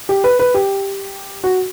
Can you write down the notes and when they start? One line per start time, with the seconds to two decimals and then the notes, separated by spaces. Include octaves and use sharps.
0.09 G4
0.24 B4
0.39 B4
0.54 G4
1.44 F#4